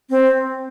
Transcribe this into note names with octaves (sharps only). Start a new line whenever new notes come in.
C4